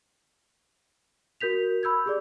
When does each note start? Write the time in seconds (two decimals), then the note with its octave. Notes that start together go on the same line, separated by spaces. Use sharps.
1.41 F#4 A#4 G6 B6 F7
1.83 B5 E6 G6 G#6
2.06 G4 G#4 D5